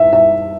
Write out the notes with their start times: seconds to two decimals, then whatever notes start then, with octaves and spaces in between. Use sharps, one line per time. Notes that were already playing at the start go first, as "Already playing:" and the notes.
Already playing: E5
0.13 E5